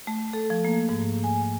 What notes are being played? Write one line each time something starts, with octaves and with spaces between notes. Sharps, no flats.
A3
A4
F3
A#3
G#2
G#5